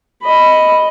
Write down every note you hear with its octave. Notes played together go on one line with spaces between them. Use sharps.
D#5 B5